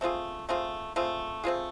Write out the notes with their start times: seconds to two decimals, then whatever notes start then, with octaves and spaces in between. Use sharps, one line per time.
0.01 A3 C4 F4 G#4
0.49 A3 C4 F4 G#4
0.96 A3 C4 F4 G#4
1.44 A3 C4 F4 G#4